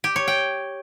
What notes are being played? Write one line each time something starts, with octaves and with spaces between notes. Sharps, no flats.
G4
C#5
G5